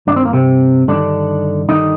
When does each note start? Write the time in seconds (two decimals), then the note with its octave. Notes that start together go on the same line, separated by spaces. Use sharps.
0.07 G2 D#3 D4
0.16 C4
0.25 A#3
0.33 C3 C4
0.88 G2 D3 D#3 D4
1.69 G2 D3 D#3 D#4